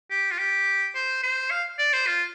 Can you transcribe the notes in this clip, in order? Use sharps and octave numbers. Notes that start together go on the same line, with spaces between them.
G4
F4
G4
C5
C5
F5
D5
C5
F4